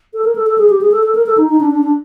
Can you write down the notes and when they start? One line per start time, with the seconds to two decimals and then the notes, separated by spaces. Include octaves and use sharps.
0.14 A4
0.24 A#4
0.36 A4
0.47 A4
0.58 G#4
0.69 G4
0.81 G#4
0.92 A4
1.03 A4
1.15 A#4
1.26 A4
1.37 D#4
1.49 D#4
1.60 D4
1.71 D4
1.83 D4